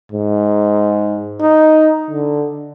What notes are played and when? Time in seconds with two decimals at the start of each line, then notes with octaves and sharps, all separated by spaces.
0.12 G#2
1.41 D#4
2.10 D3